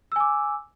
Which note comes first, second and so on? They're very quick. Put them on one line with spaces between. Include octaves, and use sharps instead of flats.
E6 G#5 D6